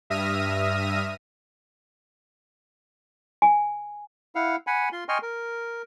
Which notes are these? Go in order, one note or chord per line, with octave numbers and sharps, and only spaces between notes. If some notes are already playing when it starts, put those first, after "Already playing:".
G2 E5 D#6 F6 A#6 D#7
G#5
E4 F5 F#5
F#5 G#5 B5
F4 C6
D#5 G5 G#5 C6 C#6 F6
A#4